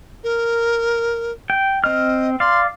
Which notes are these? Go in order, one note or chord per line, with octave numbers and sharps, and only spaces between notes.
A#4
G5
C4 D#5 F6
D5 F5 C6